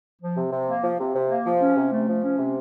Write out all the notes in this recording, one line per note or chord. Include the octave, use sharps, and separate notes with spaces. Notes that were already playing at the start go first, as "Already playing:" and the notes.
F3
C3
C3
A#3
F3
C3
C3
A#3
F3
C#4
C3
A3
F3
C#4
C3